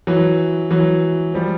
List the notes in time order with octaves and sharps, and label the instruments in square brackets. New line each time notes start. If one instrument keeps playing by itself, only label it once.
[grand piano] E3 F#3
E3 F#3
F3 G3